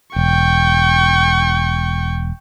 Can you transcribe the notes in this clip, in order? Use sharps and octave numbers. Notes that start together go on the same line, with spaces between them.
E1 G5 C#6